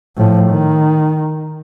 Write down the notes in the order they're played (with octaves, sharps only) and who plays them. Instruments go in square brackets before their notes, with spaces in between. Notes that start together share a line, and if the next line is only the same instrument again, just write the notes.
[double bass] A2 F3
D#3